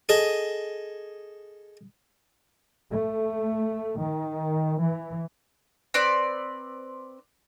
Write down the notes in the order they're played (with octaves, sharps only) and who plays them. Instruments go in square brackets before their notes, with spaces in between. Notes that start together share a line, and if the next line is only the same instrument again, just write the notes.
[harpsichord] G#4 A4 D#5
[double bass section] A3
D#3
E3
[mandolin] C4 B4 D5